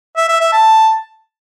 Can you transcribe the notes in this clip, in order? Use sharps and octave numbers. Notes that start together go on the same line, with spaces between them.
E5
E5
E5
A5